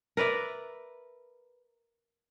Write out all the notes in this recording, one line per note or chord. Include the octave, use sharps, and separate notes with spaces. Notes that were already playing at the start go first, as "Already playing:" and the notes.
A#4 B4 D5 E5